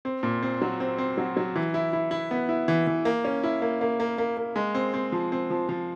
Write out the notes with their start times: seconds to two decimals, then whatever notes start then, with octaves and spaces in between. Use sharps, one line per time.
0.05 C4
0.23 A#2
0.42 C4
0.62 F#3
0.80 C4
0.98 C4
1.18 F#3
1.37 F#3
1.56 E3
1.74 E4
1.93 E4
2.11 E4
2.31 B3
2.49 E4
2.68 E3
2.87 E3
3.05 A#3
3.25 C#4
3.43 E4
3.62 A#3
3.81 A#3
4.00 A#3
4.18 A#3
4.37 A#3
4.56 G#3
4.75 C4
4.94 C4
5.12 F3
5.32 C4
5.50 F3
5.69 F3